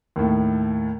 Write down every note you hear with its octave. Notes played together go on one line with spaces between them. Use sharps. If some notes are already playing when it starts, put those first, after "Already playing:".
D#2 A2